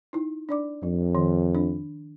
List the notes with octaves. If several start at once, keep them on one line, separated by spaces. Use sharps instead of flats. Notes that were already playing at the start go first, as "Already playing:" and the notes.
D#4 E4
D4 D5 D6
F2 F3
D#3
D4